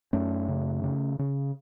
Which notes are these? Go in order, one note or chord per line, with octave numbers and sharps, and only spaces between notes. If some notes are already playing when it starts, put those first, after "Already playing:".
F#2 A3 C#4
C#3
C#3
C#3